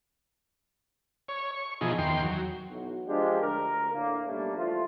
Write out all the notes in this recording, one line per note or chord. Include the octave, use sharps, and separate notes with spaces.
C#5
C#6
B2 E3 F3 D#4 G#4
E2 D#3 G5 C6
F#3
B1 E3 F#4
F3 G#3 D4 F4 G4
D2 A#4
A2 D3 A#3
B1 G3 A3 A#3 D4
E3 F3 A3 F4